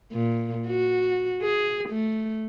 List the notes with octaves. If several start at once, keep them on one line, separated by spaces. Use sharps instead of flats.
A#2
F#4
G#4
A3